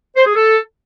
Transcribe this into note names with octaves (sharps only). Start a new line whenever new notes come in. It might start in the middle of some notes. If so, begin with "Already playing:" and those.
C5
G#4
A4